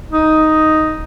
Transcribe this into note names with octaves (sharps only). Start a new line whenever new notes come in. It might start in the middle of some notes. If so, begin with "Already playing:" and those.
D#4